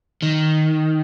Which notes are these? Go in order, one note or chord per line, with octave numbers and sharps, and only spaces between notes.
D#3